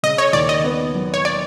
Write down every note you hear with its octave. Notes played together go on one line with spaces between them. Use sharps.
C#3 D#5
C#5
D#2 D5
D#5
B3
F#3
C#5
D5